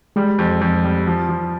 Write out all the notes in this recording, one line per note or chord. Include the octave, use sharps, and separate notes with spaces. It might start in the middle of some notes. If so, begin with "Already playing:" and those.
G3 G#3
F2
F2
G3
F3
F3